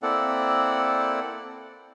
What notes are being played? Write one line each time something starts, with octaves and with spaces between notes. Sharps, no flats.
A#3 C4 E4 A4 D5 F#5